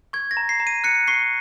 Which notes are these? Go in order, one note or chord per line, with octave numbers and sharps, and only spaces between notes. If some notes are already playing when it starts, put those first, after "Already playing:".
C#6 G#6
A#6
A#5
C7
A#5
D#7
F#6 C#7
C#6 C7